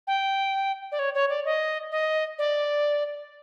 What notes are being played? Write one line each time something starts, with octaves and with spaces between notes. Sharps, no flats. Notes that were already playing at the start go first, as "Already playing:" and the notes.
G5
D5
C#5
C#5
D5
D#5
D#5
D5